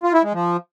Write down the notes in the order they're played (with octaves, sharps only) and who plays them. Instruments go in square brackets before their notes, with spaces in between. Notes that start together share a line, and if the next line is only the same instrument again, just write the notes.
[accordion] F4
E4
G#3
F3